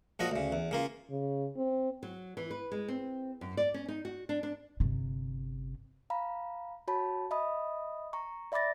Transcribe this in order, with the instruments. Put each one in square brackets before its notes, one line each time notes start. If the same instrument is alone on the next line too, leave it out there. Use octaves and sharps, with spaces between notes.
[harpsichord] A#1 F3 F#4 D#5
D2 C#3
E2
C#3 A#3 F4
[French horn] C#3
C4
[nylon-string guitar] F#3
E3
B4
G#3
C4
F#2
D5
C#4
D#4
F#4
D4
D4
[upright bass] G1 C3
[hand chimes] F5 A#5 B5
F#4 C#5 A5 B5
D#5 E5 B5 D#6
A#5 C#6
D5 E5 B5 D6 A6 A#6